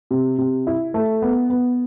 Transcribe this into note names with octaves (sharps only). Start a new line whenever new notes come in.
C3
C3
E4
A3
B3
B3